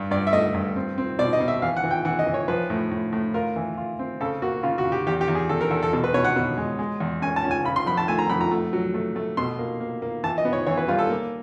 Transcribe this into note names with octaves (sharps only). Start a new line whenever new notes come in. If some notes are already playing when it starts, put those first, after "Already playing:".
Already playing: G2
G2 D5
E5
A3 D#5
G2
C4
C4
B2 D5
D#5
B2
E5
E3 F5
F#5
E3
G5
E3 F#5
D#5
E3
C#5
F3 B4
A2
A2
A2
F4 A#4
E3
F4
C4
C#3 A4
A#3 F#4
C#3 F4
F#4
C#3
G4
E2 G4
G4
E2
G#4
E2 A4
A#4
E2 A4
A4
B2 A4
B4
B2 C#5
F#5
B2
G#3
G#3
E2
C#4 G#5
A5
C#4
G#5
C#3 B5
C6
F2 B5
A5
A3 G#5
A#5
F2 B5
A#5
A3
F#3
A3
A3
B2 C6
A#3
A#3
A#3
E3 A5
D#5
B3
C#5
E3 C#5
B4
G3 F4
A4
A#3